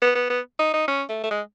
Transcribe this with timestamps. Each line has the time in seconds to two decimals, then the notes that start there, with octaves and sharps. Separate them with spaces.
0.02 B3
0.15 B3
0.30 B3
0.59 D#4
0.74 D#4
0.88 C#4
1.09 A3
1.23 A3
1.31 G#3